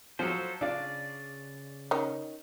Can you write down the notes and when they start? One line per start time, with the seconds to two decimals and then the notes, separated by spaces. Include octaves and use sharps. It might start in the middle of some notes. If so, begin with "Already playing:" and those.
0.19 F3 F#3 A4 C5
0.61 C#3 D4 F4 D5
1.91 D#3 C#4